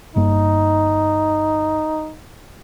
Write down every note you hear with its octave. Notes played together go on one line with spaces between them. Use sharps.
G1 G2 A#3 D#4